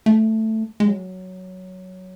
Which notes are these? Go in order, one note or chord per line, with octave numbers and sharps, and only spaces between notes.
A3
G#3
F#3